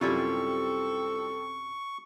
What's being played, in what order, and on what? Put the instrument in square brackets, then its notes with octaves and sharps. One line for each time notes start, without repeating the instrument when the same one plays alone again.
[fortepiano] F#2 C3 [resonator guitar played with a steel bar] G3 E4 F4 [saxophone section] C4 A4 [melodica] C#6